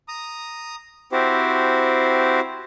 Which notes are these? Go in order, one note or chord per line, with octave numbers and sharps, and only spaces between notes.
A#5 D#6
C4 E4 F#4 G4 C5